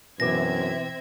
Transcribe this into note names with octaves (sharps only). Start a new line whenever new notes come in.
F#2 B2 E3 C4 E5 D6 G#6 A#6